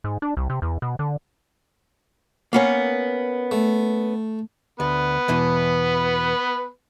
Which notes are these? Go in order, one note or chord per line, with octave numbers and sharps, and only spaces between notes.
G#2
D4
C2
C3
E2
B2
D3
A#3 B3 C#4
A3
D2 B3 B4
E2 B2 E3